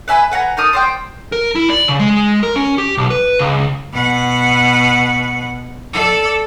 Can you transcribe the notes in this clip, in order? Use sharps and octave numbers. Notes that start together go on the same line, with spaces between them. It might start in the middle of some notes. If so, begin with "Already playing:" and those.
B4 E5 G#5 B5
B4 F#5 G#5 A#5
D#4 A#4 A5 D#6
C5 D5 G5
A#4
E4
D5
C#3
G#3
A#4
C#4
G4
B1
B4
C#2
B2 F#5
A4 D5